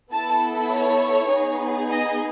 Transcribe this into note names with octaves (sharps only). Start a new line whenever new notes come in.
B3 E4 A4 A5
C#5
B3 D#4 G#4
D#5